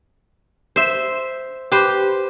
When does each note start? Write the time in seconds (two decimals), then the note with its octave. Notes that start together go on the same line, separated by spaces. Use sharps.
0.76 C5 E5
1.72 G4 B4 C5